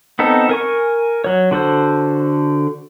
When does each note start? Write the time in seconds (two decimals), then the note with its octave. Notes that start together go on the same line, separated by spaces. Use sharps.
0.19 B3 C4 D#4 A4
0.49 A#4 G#5 C#6
1.24 F#3 C#5
1.51 D3 F#4 A4 C5